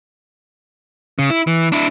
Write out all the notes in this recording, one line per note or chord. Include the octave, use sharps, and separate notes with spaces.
C#3
E4
E3
D4 E4